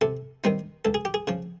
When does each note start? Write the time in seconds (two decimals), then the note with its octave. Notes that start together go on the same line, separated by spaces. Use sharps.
0.01 C3 A4
0.44 D#3 G3 C4 D#4
0.85 C#2 A4
0.94 G#4
1.05 G4
1.14 G#4
1.27 C#3 F3